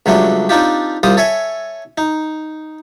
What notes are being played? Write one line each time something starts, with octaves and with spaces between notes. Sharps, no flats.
C#2 F#3 G3 A3 D4
C4 D4 D#4 F4 G4
C2 G3 F4 C5 D#6
A4 C#5 E5 G#5
D#4